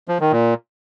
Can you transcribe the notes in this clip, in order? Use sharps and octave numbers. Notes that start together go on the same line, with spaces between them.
F3
D#3
A#2